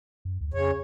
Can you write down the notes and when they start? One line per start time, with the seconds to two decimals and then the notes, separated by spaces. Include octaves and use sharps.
0.25 F#2
0.41 D2
0.54 F2 C#3 C#5